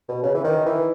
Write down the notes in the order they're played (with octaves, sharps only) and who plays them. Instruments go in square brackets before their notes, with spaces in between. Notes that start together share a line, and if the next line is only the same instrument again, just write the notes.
[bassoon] B2
C#3
E3
D#3
E3